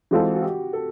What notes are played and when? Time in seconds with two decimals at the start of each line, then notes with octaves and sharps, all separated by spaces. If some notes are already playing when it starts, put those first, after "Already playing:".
0.11 E3 G#3 C4 F4 F#4 A4
0.34 F#4
0.42 G4
0.73 A4